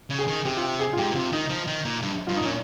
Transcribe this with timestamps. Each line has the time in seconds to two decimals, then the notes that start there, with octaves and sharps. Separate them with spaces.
0.10 C#3
0.19 G#4
0.28 D#3
0.45 C3 G4
0.57 F4
0.62 G4
0.79 G#4
0.93 F4
0.98 G#2 G4
1.11 A#2
1.15 C3 F4
1.32 D#3 D#4
1.50 F3
1.67 D#3
1.85 A#2
2.02 G2
2.27 G2 F4
2.36 D#4
2.42 A#2 C#4